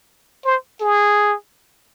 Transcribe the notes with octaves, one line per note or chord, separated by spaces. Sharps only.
C5
G#4